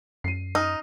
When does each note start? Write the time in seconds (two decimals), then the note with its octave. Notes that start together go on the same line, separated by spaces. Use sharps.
0.24 F#2 C7 D#7
0.55 D#4 D#6 F6